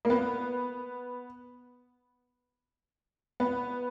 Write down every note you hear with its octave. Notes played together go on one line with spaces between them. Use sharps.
A#3
B3
B3